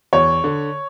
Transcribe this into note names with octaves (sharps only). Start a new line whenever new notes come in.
E2 C#5
D3